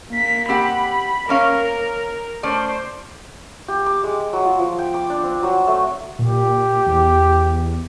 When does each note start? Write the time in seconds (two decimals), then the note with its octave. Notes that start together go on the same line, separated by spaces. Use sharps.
0.10 A#3 B6
0.49 C4 G4 F#5 B5
1.29 A#3 C#4 A#4 F5
2.43 A3 C#4 C5 D5
3.68 G4
3.86 D6
4.03 G#3
4.33 F#3
4.45 F4
4.59 F3
4.79 G5
4.94 D6
5.10 D4
5.23 C4
5.43 F#3
5.67 A3
6.19 A#2 G4
6.86 E2